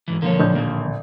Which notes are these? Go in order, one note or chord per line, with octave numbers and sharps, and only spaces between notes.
G#2 E3
E1 D3 F3 A#3 C#5
D1 A#1 G6
D#3 A#3